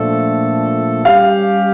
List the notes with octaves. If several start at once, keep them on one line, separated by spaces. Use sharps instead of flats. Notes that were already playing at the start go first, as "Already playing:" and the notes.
Already playing: A#2 F3 A3 D4 A4
G3 C#4 G4 F5